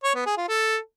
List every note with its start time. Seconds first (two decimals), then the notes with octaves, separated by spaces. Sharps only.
0.04 C#5
0.15 B3
0.26 G#4
0.37 F4
0.48 A4